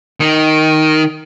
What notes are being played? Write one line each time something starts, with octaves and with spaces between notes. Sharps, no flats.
D#3